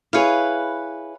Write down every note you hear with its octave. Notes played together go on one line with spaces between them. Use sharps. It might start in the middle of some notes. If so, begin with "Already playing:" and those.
E4 G#4 B4 C#5 F5